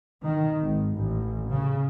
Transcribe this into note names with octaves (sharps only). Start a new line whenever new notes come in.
D#3
G#1
A1
C#3